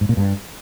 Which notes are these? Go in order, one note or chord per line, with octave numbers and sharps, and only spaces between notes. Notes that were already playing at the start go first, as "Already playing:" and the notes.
G#2
A#2
G2